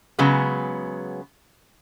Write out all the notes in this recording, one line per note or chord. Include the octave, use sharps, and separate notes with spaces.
C#3 F#3 G#3 B3